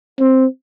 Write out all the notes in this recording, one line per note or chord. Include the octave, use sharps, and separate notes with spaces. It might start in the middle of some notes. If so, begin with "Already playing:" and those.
C4